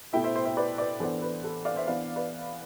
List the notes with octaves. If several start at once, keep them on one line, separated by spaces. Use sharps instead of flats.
B2 A3 E4 E5 G5
C5 E5
C5 E5
C5 E5
B4 D5
B4 D5
E3 B3 D4 A4 C5
B4
A4
D5 F5
C5 E5
E3 B3 D4 D5 F5
B4 D5